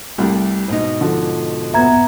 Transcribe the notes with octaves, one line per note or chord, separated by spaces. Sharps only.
C2 G3 A3
G#2 B2 D#4
D3 F3
B3 E5 A#5 G#6